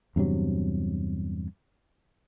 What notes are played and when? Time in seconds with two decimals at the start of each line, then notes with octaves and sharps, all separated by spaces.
0.16 E2 G2 C3 F#3